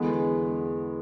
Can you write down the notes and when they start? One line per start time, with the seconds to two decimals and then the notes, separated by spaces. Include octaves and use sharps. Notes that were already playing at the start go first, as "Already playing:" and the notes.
Already playing: E2 D3 G#3 B3